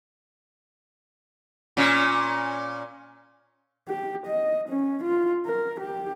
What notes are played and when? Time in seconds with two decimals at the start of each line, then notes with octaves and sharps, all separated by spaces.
1.77 A#2 C#4
3.89 G4
4.26 D#5
4.69 C#4
5.04 F4
5.46 A#4
5.80 G4